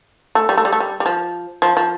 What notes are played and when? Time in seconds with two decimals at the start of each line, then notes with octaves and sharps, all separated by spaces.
0.35 A3
0.49 G3
0.58 A3
0.65 G3
0.73 A3
0.80 G3
1.00 G3
1.06 F3
1.62 F3
1.77 F3